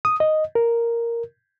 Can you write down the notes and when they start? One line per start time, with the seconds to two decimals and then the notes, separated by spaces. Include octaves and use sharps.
0.05 D#6
0.20 D#5
0.55 A#4